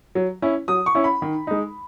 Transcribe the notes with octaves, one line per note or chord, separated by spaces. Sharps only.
F#3
C#4 E4
F#3 D#6
C#6
C#4 E4
B5
D#3
G#3 D#4